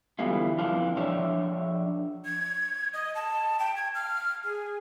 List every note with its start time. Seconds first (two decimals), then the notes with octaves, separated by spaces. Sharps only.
0.19 D3 E3 G3 B3 E4 F4
0.59 F2 E3 D4 F4
0.97 F3 D4 C#5 D5 E5
2.25 G#6
2.93 D#5
3.15 A5
3.59 G5
3.76 G#6
3.95 F6
4.44 G#4